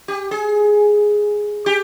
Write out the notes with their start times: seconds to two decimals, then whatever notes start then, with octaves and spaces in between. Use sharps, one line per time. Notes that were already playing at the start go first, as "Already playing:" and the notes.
0.08 G4
0.31 G#4
1.66 G4